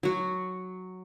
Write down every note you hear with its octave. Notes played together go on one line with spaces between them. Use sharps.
F#3 F#4